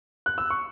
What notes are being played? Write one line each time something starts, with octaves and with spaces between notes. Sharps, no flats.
F#6
E6
C#6